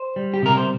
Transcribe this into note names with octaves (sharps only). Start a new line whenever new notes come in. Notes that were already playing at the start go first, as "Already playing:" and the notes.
Already playing: C5
G3
G4
C3 A#4
C5